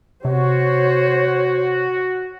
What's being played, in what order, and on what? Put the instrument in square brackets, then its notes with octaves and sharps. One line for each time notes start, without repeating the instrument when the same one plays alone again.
[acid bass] C3 [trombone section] F#4 [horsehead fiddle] C5 C#5